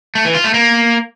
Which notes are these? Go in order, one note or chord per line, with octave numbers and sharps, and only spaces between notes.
A3
E3
F4
A3
A#3